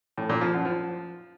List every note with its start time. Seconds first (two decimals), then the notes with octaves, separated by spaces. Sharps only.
0.18 A2
0.29 A#2
0.41 F3
0.53 F#2
0.65 F3